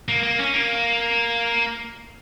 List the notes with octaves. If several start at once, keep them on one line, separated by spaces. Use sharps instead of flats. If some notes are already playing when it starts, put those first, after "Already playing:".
A#3
A#3
C#4
A#3